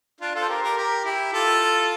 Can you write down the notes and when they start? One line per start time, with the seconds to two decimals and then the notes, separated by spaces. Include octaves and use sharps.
0.21 D4 F4
0.35 F4 A4
0.41 C5
0.48 G4 A#4
0.63 G4 A#4
0.77 G4 A#4
1.05 E4 G4
1.33 F4 A4